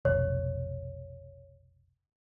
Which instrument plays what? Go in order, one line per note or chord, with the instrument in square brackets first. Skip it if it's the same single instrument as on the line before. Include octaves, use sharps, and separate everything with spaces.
[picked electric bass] F1 B1 [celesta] C#5